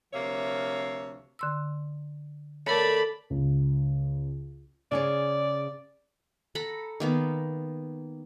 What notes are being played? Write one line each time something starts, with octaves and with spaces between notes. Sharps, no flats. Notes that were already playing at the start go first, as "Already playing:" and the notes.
D2 C3 F3 A#3 C#5 E5
D3 C6 E6
A3 A#4 C#5 D5 B5
C#2
C#3 G#4 C#5 D5
A4 F#5 A#5 B5
D#3 A#3 B3